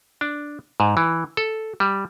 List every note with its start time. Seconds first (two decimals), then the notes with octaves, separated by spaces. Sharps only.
0.21 D4
0.80 G#2
0.97 E3
1.37 A4
1.80 G3